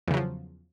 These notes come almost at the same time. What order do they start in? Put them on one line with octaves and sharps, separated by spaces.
E2 C#3 F#3 F3